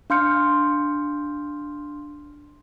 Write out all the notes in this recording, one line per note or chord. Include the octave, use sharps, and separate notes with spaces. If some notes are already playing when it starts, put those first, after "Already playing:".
D4 F5 C6 F6 G6 C#7